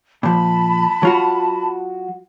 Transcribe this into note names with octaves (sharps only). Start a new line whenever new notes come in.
A#2 F3 A5 B5
F#3 F4 F#4